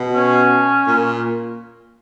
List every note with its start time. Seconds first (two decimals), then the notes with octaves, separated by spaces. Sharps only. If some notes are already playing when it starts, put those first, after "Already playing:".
Already playing: B2
0.15 C#4
0.87 A#2